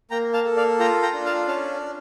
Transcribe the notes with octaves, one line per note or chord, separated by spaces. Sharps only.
A#3 G5 A#5
F5 A5
A4
D5 F5
F4 G5 A#5
G5 A#5
D4
F5 A5
C#4 F5 A5